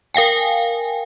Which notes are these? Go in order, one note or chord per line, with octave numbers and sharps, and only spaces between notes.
A#4 F5 G5 G#5